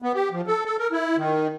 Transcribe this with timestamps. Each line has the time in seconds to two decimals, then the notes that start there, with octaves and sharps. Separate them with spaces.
0.02 B3
0.15 G4
0.31 F3
0.47 A4
0.65 A4
0.79 A#4
0.92 E4
1.17 D#3